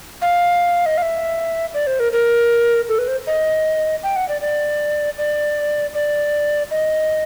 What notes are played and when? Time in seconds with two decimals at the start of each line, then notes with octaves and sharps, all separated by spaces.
0.22 F5
0.86 D#5
0.97 F5
1.02 E5
1.74 D5
1.87 C5
2.00 A#4
2.12 A#4
2.89 A4
2.99 B4
3.08 C5
3.27 D#5
4.03 G5
4.16 F#5
4.29 D5
4.41 D5
5.18 D5
5.94 D5
6.71 D#5